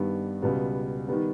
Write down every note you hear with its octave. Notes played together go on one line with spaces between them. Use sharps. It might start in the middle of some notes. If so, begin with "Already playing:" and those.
Already playing: G2 D#3 G3 B3
C#2 B2 G3 B3
D#3 G3 B3